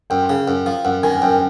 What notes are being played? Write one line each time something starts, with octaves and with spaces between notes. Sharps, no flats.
F#2 G5
C#3
F#2
F3
F#2 F#5
D#3 G#5
F#2 G5